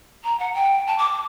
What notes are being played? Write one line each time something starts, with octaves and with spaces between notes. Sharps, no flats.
A#5
F#5
G5
A5
D6